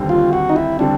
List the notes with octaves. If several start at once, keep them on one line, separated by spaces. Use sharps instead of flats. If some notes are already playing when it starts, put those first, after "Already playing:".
Already playing: F1 D#2 D3 G3 C4
F4
F#4
D#4
E4
D3 G3 C4 D4